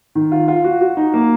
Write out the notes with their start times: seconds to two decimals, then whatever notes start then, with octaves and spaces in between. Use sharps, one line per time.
0.15 D#3
0.32 F4
0.48 F4
0.64 F#4
0.81 F#4
0.97 D#4
1.14 A#3